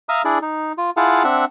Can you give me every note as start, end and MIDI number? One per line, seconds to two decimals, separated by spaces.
0.09 0.22 76
0.09 0.22 77
0.09 0.22 82
0.09 0.22 87
0.09 0.22 89
0.25 0.38 62
0.25 0.38 64
0.25 0.38 68
0.25 0.38 74
0.42 0.72 63
0.78 0.90 65
0.97 1.23 64
0.97 1.23 65
0.97 1.23 68
0.97 1.23 77
0.97 1.23 78
0.97 1.23 81
1.24 1.45 60
1.24 1.45 62
1.24 1.45 76
1.24 1.45 78